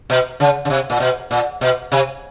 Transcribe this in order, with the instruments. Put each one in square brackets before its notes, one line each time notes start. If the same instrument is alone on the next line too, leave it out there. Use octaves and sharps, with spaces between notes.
[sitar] B2
C#3
C#3
C3
A#2
B2
A#2
B2
C3